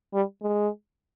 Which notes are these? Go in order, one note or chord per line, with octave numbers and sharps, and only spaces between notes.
G3
G#3